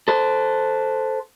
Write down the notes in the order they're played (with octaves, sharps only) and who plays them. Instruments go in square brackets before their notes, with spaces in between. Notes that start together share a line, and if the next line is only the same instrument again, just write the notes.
[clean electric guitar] A4 C5